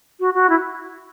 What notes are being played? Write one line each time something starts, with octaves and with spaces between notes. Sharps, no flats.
F#4
F#4
E4